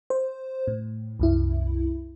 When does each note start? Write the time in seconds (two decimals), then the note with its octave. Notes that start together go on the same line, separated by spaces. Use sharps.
0.10 C5
0.68 A2
1.19 C2 F#2 E4